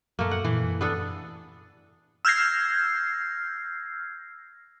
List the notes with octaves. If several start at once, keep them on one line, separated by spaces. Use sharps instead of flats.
F#2 A3 A#3
F#5
A#2 E3
F#2
B3 D4 A4
E6 F6 G6 G#6 A#6 C7